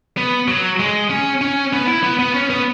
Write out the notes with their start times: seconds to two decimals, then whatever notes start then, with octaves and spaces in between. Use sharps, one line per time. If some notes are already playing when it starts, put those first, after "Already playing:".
0.17 B3
0.48 F#3
0.80 G#3
1.10 C#4
1.41 C#4
1.73 B3
1.88 E4
2.03 B3
2.19 B3
2.34 C#4
2.50 B3